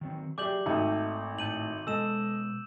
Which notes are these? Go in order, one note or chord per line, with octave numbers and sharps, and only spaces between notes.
D#3 F#3 C4
F#3 G4 G#4 D5 E5 D6 G6 F#7
G#1 D#3 A3 D#4 D#5
A2 A5 G6 D#7 F#7
B2 G#3 A4 D#5 E6 E7 F#7